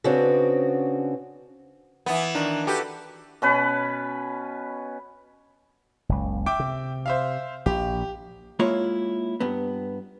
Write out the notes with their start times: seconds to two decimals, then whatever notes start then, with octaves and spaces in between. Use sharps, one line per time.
0.04 C#3 B3 C4 D4 F#4
2.06 E3 B3
2.35 D#3 D4 A#5
2.67 F#4 G4 A4 B4
3.42 B2 C#4 B4
6.09 F#1 C#2
6.46 E5 G5 D6
6.60 C3
7.06 C5 E5 F5
7.66 A#1 A#2 G4
8.59 G#3 A#3 E4 F4 C#5
9.40 G2 B3